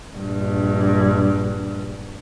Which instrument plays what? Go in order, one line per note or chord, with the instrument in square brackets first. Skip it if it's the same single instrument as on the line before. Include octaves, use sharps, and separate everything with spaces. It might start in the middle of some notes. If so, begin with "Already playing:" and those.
[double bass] A#1 G2